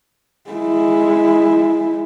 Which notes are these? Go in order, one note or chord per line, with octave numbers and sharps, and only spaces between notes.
G#3 E4